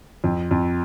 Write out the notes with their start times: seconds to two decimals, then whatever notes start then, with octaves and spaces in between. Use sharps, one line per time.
0.24 F2
0.51 F2